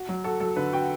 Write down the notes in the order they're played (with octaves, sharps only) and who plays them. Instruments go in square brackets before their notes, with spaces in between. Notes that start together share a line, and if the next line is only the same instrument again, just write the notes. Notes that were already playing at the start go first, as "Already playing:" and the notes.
Already playing: [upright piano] F#4
F#3
[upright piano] F#4 [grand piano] A4
[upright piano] F#3 [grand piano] A4
[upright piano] D3 [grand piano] B4
[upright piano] F#4 [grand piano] G5